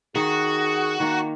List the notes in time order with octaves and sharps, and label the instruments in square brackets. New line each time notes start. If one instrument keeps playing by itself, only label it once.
[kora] D#3 [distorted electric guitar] F#4 [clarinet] G#4
[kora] D#3 A#3